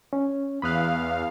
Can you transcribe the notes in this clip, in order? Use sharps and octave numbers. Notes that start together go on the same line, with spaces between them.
C#4
E2 F5 B5 D#6 F#6